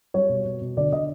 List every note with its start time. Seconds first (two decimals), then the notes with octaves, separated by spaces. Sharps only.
0.14 G3 C#5
0.29 B2
0.45 B2
0.61 B2
0.77 D3 D5
0.92 D3 D#5